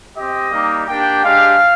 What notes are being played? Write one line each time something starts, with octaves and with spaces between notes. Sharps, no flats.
C4 G4 D#5
G3 A#3 D#4 G4
A#3 D4 G4 G5
G#3 D4 G4 F5